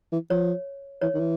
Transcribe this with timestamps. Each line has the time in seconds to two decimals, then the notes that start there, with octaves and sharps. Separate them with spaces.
0.12 E3
0.30 F3 C#5
1.01 E3 C#5
1.14 D#3
1.19 E3